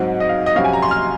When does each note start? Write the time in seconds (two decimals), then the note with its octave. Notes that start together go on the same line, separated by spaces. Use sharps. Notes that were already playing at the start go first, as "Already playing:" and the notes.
Already playing: G#2 F#3 C4
0.20 D#5
0.29 F5
0.46 D#5
0.55 F2 C3 F#3 C#4 F5
0.64 G#5
0.73 A#5
0.82 C6
0.91 F6